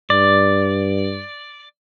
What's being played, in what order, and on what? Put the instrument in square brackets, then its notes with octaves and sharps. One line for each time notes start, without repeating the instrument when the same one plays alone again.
[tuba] G2 [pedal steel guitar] D5